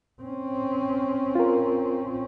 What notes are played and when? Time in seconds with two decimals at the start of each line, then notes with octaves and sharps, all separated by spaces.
0.23 C4 C#4
1.35 F4 A#4